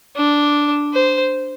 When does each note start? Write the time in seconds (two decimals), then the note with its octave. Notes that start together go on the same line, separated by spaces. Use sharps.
0.16 D4
0.93 C5